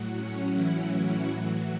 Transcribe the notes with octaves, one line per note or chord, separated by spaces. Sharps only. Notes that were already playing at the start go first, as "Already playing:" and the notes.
Already playing: A2 F#3 F#4
C#4
E3 E4
E3 E4
A2 E3 F#3 F#4